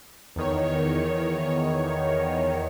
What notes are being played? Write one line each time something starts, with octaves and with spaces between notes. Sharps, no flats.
E2 D#3 C#5